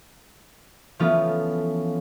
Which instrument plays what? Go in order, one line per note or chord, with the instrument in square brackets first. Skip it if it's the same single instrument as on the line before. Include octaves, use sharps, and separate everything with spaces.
[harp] E3 F3 A3 B3 C#4 F4